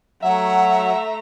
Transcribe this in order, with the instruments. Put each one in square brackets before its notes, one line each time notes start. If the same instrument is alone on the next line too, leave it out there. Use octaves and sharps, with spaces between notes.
[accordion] F#3 [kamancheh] A3 A#5 [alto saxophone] E5 [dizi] F#5